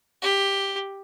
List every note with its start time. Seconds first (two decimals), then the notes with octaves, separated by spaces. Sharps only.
0.22 G4